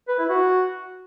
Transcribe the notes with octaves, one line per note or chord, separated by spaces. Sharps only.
B4
E4
F#4